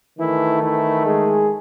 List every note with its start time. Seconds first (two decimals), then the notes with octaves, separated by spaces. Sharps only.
0.18 D#3 E3 A3 E4
0.62 E3 E4
1.05 G#3 G#4